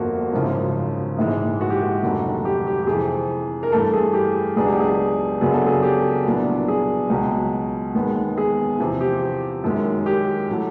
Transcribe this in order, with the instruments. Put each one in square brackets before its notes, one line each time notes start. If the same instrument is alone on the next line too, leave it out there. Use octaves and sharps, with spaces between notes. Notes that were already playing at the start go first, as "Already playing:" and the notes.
Already playing: [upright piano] G1 F2 D3 F3 A#3 F#4
G#1 F#2 C#3 F3
A#1 G#2 E3 G#3
F#4
G4
F#4
F1 D#2 D3 F#3
G4
G4
G4
F2 C3 E3 G#4
A#4
G2 E3 A3 A4
G#4
G4
C#2 B2 F#3 B3 D4 G#4
G4
G#4
F#2 C#3 F#3 B3 D4 G#4
A4
G#4
G4
C2 A#2 F#3 B3 D4
G#4
C#2 B2 F#3
E1 D#2 D#3 G#3 B3
G#4
E2 C3 F3
G4
F#2 D#3 G#3
G4
A2 F#3 A3